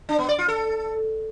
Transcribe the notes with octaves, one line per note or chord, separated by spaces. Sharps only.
D4
B3
D5
F4
A4